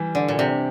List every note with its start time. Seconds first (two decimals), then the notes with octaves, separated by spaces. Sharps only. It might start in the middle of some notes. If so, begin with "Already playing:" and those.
Already playing: E3 G3
0.15 D3
0.28 A#2
0.38 C3 D4